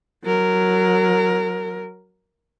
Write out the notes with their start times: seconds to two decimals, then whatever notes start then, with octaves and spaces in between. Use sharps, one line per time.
0.24 F#3 A#4